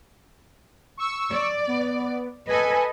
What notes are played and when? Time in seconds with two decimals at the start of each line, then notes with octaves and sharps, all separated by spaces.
0.97 C#6 E6
1.31 D5
1.67 B3
2.48 A4 B4 D#5 G#5